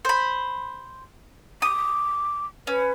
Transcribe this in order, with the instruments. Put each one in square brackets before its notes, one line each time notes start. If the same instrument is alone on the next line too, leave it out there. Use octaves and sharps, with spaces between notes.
[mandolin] C5 B5
[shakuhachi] D6 [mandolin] D#6
[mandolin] C#4 [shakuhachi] B4